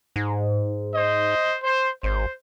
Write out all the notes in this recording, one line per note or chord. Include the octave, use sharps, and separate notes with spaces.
G#2
C5 D#5
C5
G#1 C5